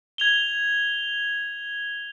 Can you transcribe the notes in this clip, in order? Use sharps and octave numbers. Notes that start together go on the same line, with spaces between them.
G#6 F7 G7